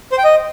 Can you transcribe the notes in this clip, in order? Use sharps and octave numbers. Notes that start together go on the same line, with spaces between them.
C5
G5
D#5